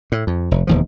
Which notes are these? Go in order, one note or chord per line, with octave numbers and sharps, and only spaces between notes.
A2
F2
F1
E1 D#2 F3